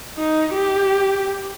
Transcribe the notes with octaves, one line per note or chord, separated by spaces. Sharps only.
D#4
G4